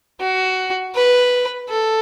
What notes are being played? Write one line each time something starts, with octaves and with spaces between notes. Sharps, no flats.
F#4
B4
A4